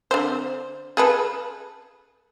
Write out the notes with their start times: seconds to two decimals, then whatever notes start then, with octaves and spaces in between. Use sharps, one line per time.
0.11 D3 C4 C5
0.97 G#4 A4 B4